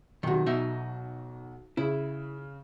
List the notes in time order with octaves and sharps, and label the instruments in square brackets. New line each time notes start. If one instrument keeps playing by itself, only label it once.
[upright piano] B1 F#4 [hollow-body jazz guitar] C3 D#3
[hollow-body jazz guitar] B2 D#4 E5
[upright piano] C#3 [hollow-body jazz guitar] E4